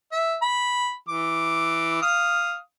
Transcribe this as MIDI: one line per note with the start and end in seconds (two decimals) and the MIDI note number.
0.12 0.36 76
0.42 0.93 83
1.09 2.00 52
1.09 2.00 86
2.02 2.56 77
2.02 2.56 87